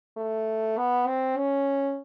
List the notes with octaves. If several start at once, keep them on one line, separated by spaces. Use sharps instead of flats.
A3
B3
C4
C#4